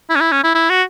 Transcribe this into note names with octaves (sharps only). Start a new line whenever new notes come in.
E4
C#4
E4
C#4
E4
E4
F#4